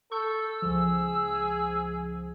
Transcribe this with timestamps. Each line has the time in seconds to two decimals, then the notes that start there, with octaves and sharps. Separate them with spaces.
0.12 A4 C#6 E6 G6
0.62 C#2 F3 G#4